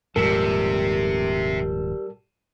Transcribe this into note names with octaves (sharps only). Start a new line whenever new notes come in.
D#1 G#2 C3 F3 G3 A4 A#4